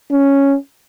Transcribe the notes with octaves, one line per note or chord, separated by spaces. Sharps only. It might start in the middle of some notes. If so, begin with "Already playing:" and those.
C#4